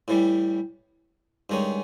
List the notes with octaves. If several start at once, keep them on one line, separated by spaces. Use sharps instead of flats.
A2 E3 G3
G2 D#3 G#3 C#4